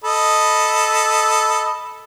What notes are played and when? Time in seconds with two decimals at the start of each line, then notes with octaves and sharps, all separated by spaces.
0.04 A4 D#5 B5